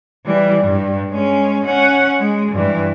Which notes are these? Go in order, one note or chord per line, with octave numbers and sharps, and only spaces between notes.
E3 G3
G2
G#3 C#4
C#4 F#5
G#3
G2 E3